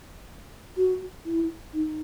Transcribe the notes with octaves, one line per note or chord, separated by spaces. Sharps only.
F#4
E4
D#4